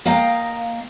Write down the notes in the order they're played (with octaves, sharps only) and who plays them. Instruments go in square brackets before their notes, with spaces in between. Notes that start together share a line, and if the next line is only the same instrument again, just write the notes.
[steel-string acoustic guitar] A#3 D#5 F5 G5 A#5